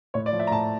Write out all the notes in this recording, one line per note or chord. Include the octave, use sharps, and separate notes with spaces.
A2 C#5
D5
F3
E5
A#5
A2 A5